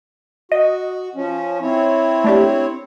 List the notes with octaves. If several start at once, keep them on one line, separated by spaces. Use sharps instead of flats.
F#4 D#5
F3 C#4
C4 E4 C#5
A3 D4 G4